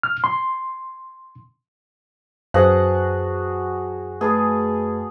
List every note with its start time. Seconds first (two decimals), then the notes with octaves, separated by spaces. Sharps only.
0.03 F6
0.24 C6
2.54 F#2 F#4 G#4 B4 C5 F5 F#5 A5
4.21 A3 G#4 B4 A5 D#6